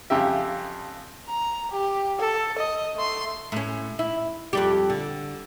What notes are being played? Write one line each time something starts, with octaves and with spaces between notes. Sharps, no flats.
F2 C#3 G4 E5
A#5
G4
A4
D#5
A3 C6
A2 C#4
E4
F2 G3 G4
D3